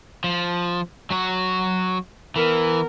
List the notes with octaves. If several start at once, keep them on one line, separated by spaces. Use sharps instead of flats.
F3
F#3 F#4
E3 B3 A#4